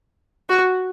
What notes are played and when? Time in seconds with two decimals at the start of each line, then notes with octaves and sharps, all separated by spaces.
0.50 F#4